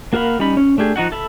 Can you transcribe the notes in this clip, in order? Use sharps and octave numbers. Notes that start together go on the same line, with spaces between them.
A#3 F#4 A#4 F5 B5
G3 C#4 D#4 B5
C#4
A3 D4 G4 G#4
F3 D#4 F#4 F#5
A4 E5 B5